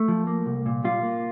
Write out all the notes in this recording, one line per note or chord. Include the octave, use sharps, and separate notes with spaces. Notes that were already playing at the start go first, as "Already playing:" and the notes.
Already playing: A3
F3
A#3
C2
A#2
G3 F4
A#3